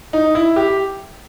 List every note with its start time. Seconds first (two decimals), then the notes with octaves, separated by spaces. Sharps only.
0.13 D#4
0.35 E4
0.56 G4